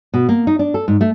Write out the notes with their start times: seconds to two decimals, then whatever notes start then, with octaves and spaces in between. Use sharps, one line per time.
0.14 B2
0.29 A#3
0.47 D#4
0.59 D4
0.74 A4
0.88 G#2
1.01 A3